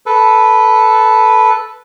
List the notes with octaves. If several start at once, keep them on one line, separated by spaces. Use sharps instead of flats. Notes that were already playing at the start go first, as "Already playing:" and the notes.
A4 B4